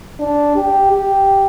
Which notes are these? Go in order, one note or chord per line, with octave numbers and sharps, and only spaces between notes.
D4
G4
G4